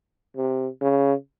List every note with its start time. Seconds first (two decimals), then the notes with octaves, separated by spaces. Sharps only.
0.36 C3
0.81 C#3